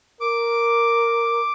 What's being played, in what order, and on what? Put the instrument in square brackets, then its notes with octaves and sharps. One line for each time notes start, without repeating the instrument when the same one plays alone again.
[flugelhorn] A#4 [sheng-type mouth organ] D6